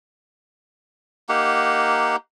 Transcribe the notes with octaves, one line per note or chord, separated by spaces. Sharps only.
A#3 D#4 G4 F#5